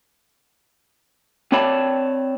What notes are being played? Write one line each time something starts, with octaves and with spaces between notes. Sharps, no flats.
C4 C#5 D5 A5 B5